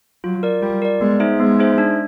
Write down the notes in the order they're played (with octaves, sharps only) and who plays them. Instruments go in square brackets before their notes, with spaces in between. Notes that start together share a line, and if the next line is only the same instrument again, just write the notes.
[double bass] F#3 [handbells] F4
[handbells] A#4 D5
[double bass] G3 [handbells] F4
[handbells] A#4 D5
[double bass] G#3 [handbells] B3
[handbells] D#4 G#4 C5 E5
[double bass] G#3 [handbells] B3
[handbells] D#4 G#4 C5 E5
D4